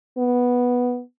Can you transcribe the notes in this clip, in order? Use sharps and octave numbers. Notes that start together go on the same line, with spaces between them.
B3